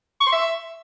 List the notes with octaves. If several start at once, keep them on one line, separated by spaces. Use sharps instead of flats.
C#6
C6
E5